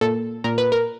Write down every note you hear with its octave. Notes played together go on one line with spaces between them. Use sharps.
A#2 A4
A#2 A#4
B4
A#4